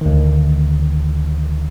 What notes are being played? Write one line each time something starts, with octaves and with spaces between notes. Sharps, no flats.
D2 D#3